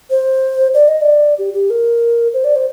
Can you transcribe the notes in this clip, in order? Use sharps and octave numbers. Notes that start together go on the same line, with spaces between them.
C5
D5
D#5
D5
G4
G4
A#4
C5
D5
C5